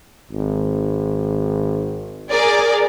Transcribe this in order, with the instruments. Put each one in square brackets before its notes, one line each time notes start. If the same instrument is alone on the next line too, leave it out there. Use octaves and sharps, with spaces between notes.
[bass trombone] G#1
[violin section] G#4 A#4 D5